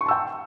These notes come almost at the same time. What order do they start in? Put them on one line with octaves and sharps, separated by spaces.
C#6 C6 A5 E6 G5